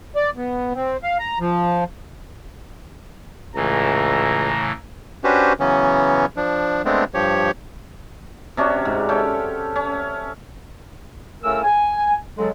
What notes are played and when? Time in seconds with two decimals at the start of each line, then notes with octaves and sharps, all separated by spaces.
0.16 D5
0.37 B3
0.74 C4
1.03 F5
1.19 A#5
1.40 F3
3.55 C#2 A2 C#3 E3 A#5
5.24 C#4 D4 F#4 G4 B4 C5
5.60 C#3 E3 F#3 B3 C#4
6.37 F3 D4
6.85 G#3 A3 B3 C4 D4
7.14 G2 F3 G4 C#5
8.57 C3 C#4 D4 F#4
8.85 G#2
9.09 C#4 A4 E5 G5
9.76 C#4
11.43 A2 C#3 A3 A#4 G#5 E6
11.64 G#5
12.38 C#3 F#3 G#3 A4